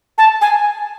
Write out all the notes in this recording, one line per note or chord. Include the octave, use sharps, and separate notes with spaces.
A5
G#5